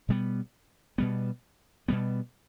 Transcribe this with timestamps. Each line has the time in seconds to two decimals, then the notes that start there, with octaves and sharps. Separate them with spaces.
0.09 B2 G3 B3
0.98 B2 G3 B3
1.88 B2 G3 B3